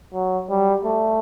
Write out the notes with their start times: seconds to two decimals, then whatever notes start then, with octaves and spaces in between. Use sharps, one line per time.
0.13 F#3
0.49 G3
0.85 A3